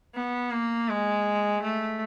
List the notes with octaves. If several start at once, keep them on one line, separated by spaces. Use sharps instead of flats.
B3
A#3
G#3
A3